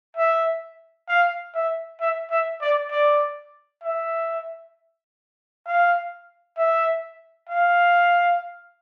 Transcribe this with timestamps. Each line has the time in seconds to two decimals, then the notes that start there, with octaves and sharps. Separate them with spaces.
0.17 E5
1.08 F5
1.54 E5
2.01 E5
2.31 E5
2.61 D5
2.91 D5
3.83 E5
5.66 F5
6.58 E5
7.49 F5